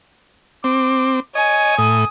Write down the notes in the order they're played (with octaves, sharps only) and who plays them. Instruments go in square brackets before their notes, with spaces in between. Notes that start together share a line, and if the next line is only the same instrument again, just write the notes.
[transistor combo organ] C4 [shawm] D6
[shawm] C#5 [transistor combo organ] D#5 [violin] G#5
[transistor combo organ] A2 [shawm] D#6